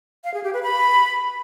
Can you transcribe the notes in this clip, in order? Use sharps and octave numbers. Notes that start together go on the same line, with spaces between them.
F5
G#4
G4
B4
B5